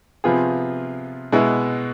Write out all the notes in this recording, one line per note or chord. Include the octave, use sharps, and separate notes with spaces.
C3 F3 B3 F4 G#4
B2 G#3 B3 E4